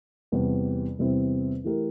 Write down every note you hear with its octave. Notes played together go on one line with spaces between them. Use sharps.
E2 C3 G3
E2 C3 G3 C4 E4
E3 A3 E4 G4 A#4